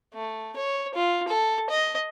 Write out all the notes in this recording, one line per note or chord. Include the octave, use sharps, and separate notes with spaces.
A3
C#5
F4
A4
D#5